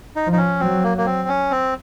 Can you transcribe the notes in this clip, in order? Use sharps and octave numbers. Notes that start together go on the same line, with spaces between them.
D#4
F3
D#4
C#4
F#3 C4
A#3
A#3
C4
C#4
C4